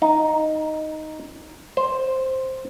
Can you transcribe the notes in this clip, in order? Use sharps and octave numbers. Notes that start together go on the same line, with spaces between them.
D#4
C5